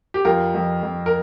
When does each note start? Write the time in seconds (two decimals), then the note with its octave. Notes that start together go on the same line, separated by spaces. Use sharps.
0.14 G4
0.24 F2 F4 A#4
0.54 F2
0.83 F2
1.06 A#4